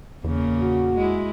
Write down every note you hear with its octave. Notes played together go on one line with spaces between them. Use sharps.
E2 A#2 C#3 A#3
F#4
G#3 E4